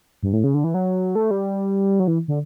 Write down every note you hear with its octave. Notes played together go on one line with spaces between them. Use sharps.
G2
A2
C#3
D3
E3
F#3
A3
G3
F#3
E3
D3